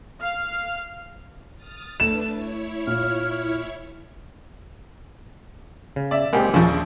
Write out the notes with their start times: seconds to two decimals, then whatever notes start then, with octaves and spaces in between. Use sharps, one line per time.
0.20 F5
1.55 D#6 F6 A6
2.00 A3 D4 B4 A5 E7
2.30 E4 C#5
2.87 A#2 F6
5.96 C#3
6.11 D5 E5
6.33 C#2 G#3 A#3 C4 G4
6.54 A#1 D#2 C#3 F3 A5